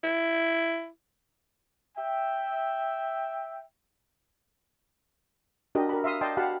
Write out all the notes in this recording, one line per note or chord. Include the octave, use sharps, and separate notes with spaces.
E4
E5 G5
D4 F#4 G4 A#4 D#5
A#4 F#5 B5
E5 F5 C6 D#6
D5 D#5 G5 A5 C6
F#4 G4 F5 F#5 A5 B5